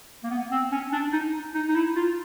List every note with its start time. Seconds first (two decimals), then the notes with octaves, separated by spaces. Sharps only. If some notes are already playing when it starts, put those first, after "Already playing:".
0.24 A#3
0.30 B3
0.51 C4
0.72 C#4
0.92 D4
1.13 D#4
1.54 D#4
1.68 D#4
1.75 E4
1.96 F4